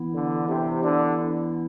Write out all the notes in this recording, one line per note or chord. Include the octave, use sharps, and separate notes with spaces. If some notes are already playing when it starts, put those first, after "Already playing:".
Already playing: E3 B3 E4
D3
C3
D3